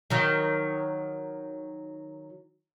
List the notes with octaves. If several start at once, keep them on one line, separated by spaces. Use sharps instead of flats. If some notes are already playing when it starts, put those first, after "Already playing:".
D#3 F#3